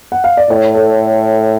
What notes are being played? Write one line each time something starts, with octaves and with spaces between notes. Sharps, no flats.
F#5
F5
D5
A2 C#5
A4